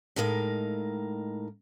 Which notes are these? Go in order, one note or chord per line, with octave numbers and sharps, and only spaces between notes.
A2 G#3 D#4 A#4 F5